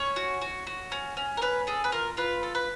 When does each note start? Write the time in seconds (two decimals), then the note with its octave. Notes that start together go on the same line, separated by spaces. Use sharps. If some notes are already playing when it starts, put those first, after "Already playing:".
Already playing: C#4 C#5
0.16 F#4
0.41 F#4
0.67 F#4
0.92 C#4
1.17 C#4
1.37 A#4
1.41 C#4 B4
1.67 G#4 A4
1.84 B4
1.92 F4 A#4
2.17 F4 B4
2.43 A4
2.55 B4